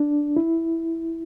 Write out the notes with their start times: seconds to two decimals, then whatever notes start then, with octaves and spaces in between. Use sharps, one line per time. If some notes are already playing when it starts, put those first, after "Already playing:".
Already playing: D4
0.36 E4